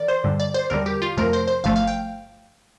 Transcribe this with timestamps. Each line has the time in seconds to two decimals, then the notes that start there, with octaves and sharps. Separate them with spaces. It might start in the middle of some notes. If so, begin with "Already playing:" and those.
Already playing: E3 A#4 D5
0.08 C5
0.24 G2 D3 G3
0.40 D5
0.54 C5
0.70 E2 D3 G3 A#4
0.86 G4
1.02 F4
1.17 F2 C3 F3 A3 A#4
1.33 C5
1.48 C5
1.64 G1 G2 F3 A3 F5
1.76 F5
1.87 G5